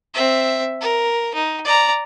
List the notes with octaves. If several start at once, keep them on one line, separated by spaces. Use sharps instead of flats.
C4 E5
A#4
D#4
D5 A#5